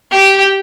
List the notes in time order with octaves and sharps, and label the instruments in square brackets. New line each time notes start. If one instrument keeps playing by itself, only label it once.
[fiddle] G4